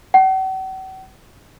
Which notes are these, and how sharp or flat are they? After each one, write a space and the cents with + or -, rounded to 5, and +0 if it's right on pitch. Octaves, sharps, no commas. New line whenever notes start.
F#5 +45